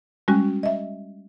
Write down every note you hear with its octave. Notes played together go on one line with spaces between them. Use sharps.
G3 G#3 C#4 F#4
D#5 E5